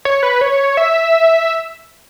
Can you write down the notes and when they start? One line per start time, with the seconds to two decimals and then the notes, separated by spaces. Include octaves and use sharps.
0.05 C#5
0.23 B4
0.41 C#5
0.77 E5